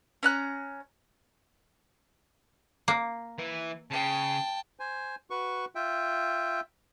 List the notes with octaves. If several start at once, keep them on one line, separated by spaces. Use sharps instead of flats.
C#4 A#5 F#6
A#3
E3
C#3 G5 A5
C5 G#5
F#4 B4 C#6
F4 E5 G5